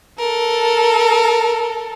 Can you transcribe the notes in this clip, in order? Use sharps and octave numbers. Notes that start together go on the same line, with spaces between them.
A4 A#4